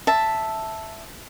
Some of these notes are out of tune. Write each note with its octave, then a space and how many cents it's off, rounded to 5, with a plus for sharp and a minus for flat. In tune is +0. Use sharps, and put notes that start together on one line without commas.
E5 +0 A5 +0